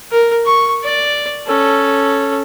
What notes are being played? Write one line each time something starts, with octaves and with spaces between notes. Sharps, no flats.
A#4
C#6
D5
C#4 A4